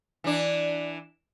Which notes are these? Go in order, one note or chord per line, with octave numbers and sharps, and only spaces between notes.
E3 D4